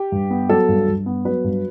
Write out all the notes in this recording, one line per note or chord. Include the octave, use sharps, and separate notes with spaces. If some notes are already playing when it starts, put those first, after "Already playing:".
Already playing: G4
G2
B3
F#3 A4
G2
G2
B3
F#3 B4
G2